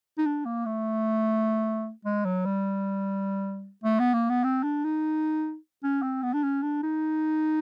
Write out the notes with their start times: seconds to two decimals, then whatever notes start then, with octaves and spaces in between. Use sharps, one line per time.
0.18 D#4
0.26 D4
0.45 A#3
0.66 A3
2.05 G#3
2.25 F#3
2.45 G3
3.84 A3
4.00 B3
4.14 A#3
4.30 B3
4.44 C4
4.63 D4
4.84 D#4
5.83 C#4
6.03 C4
6.23 B3
6.34 D4
6.43 C#4
6.63 D4
6.83 D#4